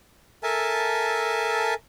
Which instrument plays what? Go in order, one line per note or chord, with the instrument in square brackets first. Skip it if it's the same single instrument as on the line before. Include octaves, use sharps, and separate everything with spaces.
[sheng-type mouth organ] A4 A#4 E5 G#5 A5